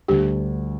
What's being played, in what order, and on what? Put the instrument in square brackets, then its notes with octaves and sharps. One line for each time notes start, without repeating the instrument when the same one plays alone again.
[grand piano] D2 D3 G3 [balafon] G4